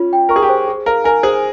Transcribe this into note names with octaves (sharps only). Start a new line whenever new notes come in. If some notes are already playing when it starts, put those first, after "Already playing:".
Already playing: C#4 F4
G5
A#4 C#6
G#4
G4
C5
G#4
A#4 F5
A#4 G#5
G#4 C5